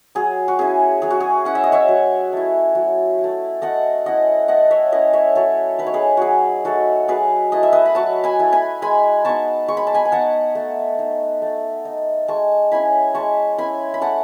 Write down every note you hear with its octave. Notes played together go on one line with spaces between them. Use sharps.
F#3 G#4
F#4
C#4 E4 G#4
F#3 G#4
F#4
G#4
C#4 E4 F#5
E5
D#5
C#5 E5
F#3
A3 E4
F#3
E4
A3
A3 D#5 F#5
C#4 E4 D#5 F#5
A3 D#5 F#5
C#5 E5
C#4 E4 B4 D#5
C#5 E5
F#3 A4 C#5
A3 D#4 B4
C#5
G#4 B4
F#3 F#4 G#4
A3 D#4 F#4 A4
F#3 G#4 B4
A3 E4 D#5
E5
B4 D#5
B5
F#3 A5 C#6
G#5 B5
A3 E4
G#5 B5
G#3 G#5 B5
B3 D#4 A5 C#6
G#3 C#6
B5
A5
G#5 B5
G#5
B3 D#4 F#5 A5
A3
D#4
A3
D#4
G#3 A5 C#6
C#4 E4 G#5 B5
G#3 A5 C#6
C#4 E4 G#5 B5
B5
A3 F#5 A5